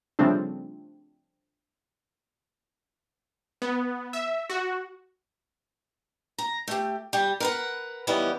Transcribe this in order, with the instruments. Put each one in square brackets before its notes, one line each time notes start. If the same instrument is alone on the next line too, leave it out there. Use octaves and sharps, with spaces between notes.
[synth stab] C#3 F3 G3 A3 C4 D4
[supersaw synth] B3
E5
F#4
[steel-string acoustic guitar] A#5
A3 G4
G3 G4
A#4 B4 F#5
D#3 E3 G3 B3 C#4 E4